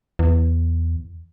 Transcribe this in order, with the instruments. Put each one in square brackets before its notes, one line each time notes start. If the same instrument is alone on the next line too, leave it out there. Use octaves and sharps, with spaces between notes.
[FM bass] E2